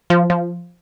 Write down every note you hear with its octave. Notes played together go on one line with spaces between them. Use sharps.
F3
F3